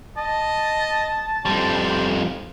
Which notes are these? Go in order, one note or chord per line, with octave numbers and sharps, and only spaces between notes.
D#5 A5
F2 G3 C5